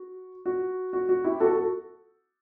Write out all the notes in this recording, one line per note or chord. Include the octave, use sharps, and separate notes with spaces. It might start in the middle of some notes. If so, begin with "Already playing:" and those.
Already playing: F#4
F#4
F#4
F#4
E4 G4
F#4 A4
F#4 A4